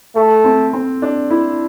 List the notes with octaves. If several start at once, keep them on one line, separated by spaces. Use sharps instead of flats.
A3 A4
C4
C4
D4
E4